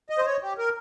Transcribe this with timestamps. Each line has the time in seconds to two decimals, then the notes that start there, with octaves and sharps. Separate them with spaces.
0.10 D#5
0.18 C5
0.26 C#5
0.42 G4
0.58 A#4